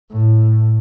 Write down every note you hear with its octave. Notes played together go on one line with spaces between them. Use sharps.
A2